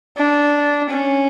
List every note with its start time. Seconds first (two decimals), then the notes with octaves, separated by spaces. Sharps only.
0.18 D4
0.90 C#4